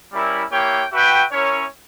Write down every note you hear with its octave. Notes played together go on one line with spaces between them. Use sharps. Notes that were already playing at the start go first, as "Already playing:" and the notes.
G3 C#4 E4 A#4
A#3 E4 G4 C#5 G5
F#4 B4 E5 G5
C#4 E4 A#4 C#5